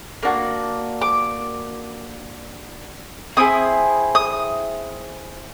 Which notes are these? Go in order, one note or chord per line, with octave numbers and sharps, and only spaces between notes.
A#3 D4 F#4
D6
C4 E4 G#4 D#6
D#6